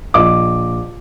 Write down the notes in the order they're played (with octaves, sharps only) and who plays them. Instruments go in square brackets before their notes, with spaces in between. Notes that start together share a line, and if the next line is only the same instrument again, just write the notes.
[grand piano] A#1 D#5 D6